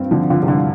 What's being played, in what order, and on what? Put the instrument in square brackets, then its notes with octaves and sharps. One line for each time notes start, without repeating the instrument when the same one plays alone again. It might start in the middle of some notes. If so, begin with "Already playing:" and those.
Already playing: [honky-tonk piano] G2 C4 F4
[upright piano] D3 [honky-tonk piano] F3
[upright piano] D3 [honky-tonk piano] F4
[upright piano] C3
[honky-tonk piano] G2 [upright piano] D3